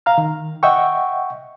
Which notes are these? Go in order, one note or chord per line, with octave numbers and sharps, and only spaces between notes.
F5 A#5 F6
D#3
D#5 E5 F#5 G5 C#6